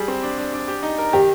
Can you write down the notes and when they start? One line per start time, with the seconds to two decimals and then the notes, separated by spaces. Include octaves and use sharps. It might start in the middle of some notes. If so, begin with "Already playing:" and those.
Already playing: G3 G#4
0.08 C4
0.23 D4
0.38 D4
0.53 D4
0.68 G4
0.83 D#4
0.98 A#4
1.13 D#3 G4